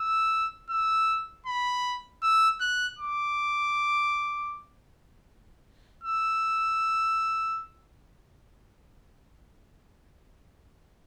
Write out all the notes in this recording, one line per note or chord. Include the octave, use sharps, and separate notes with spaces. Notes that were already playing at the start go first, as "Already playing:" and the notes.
Already playing: E6
E6
B5
E6
F#6
D6
E6